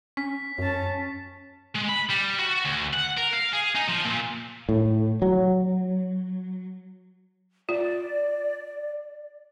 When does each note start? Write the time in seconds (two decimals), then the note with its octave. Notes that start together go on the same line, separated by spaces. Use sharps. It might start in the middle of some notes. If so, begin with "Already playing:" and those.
0.17 C#4 B6
0.59 F#2 C#4 A5
1.76 G#3
1.89 B5
2.10 G3
2.39 F#4
2.64 D2
2.93 F#5
3.17 A#4
3.33 F5
3.53 G#4
3.76 D#4
3.89 F3
4.05 A#2
4.69 A2
5.22 F#3
7.69 F4 D5